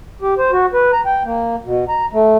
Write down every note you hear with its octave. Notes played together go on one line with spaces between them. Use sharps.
G4
C5
F#4
B4
A#5
G5
A#3
B2
A#5
A3